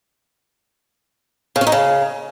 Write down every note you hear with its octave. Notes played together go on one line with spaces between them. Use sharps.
C#3
C#4
D#4
C#3